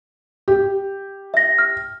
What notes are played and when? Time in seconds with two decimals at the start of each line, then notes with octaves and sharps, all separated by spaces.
0.48 G4
1.34 E5 A#6
1.58 F6